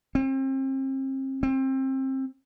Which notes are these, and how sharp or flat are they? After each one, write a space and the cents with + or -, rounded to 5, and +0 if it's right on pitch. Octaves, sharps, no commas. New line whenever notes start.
C4 +35
C4 +25